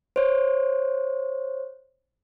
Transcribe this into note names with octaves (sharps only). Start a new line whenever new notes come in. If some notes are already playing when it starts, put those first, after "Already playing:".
C5 C#5